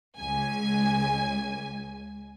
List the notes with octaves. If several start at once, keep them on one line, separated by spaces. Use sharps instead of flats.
C#2 G#5